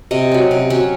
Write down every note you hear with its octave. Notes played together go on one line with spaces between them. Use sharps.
C3 D#5
F#3 C#4
C3
F#3 C#4